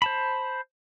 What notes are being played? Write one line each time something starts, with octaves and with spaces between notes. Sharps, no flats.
C5 A5 B5